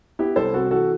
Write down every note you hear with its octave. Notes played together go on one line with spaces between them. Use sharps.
B3 E4 G4
C2 A4 C5
C3 F#4 A4
E3 F#4 A4